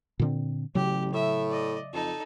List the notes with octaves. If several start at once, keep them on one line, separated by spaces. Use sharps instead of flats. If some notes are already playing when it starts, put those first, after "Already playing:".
A#2 D3 C4
A1 C#3 F#3 G4
A2 E5
D5 D#5
F2 D#4 A4